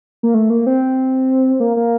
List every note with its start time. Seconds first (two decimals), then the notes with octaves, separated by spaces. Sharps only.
0.23 A#3
0.34 A3
0.50 A#3
0.66 C4
1.60 A#3
1.76 A#3